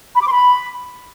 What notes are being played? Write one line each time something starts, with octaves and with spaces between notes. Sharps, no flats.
B5
D6
C6
B5